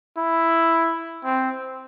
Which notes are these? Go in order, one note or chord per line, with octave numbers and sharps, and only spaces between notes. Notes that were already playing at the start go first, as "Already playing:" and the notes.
E4
C4